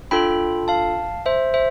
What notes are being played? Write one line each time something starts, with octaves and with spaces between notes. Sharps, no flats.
D4 F4 A4 G5 B5
F5 A5
C5 E5
C5 E5